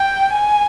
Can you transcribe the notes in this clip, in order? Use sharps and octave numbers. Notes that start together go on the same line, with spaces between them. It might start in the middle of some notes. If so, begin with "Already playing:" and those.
Already playing: G5
G#5